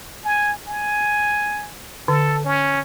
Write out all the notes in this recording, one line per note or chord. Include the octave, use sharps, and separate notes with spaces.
G#5
G#5
D3 A4
C#4